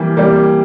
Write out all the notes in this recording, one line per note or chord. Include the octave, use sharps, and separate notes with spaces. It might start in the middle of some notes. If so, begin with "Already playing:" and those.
Already playing: E3 G3 A#3
G3 A#3